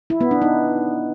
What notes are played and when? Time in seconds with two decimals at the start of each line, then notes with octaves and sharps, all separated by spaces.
0.10 E4
0.21 B3
0.31 D4
0.42 D#4